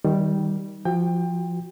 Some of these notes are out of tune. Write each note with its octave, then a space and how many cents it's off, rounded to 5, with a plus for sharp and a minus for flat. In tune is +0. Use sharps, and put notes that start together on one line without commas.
D#3 +15 G3 -5
F3 -10 F#4 +0 G5 +25